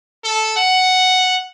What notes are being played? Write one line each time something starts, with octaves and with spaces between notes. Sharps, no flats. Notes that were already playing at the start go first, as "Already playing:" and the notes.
A4
F#5